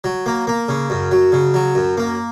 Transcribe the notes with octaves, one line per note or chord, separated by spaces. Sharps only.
F#3
A#3
A#3
C#3
F#2
F#3
C#3
F#3
F#2
A#3